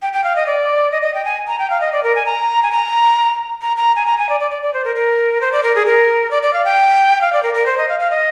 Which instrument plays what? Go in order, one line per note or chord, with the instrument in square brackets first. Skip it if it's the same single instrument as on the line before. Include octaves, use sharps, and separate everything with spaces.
[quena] G5
G5
F5
D#5
D5
D#5
D#5
G5
G#5
A#5
G5
F5
D#5
D5
A#4
G#5
A#5
G#5
A#5
A#5
A#5
G#5
A#5
G#5
D5
D5
D5
D5
C5
A#4
A#4
C5
D5
A#4
G#4
A#4
D5
D5
F5
G5
F5
D5
A#4
A#4
C5
D#5
F5
F5
D#5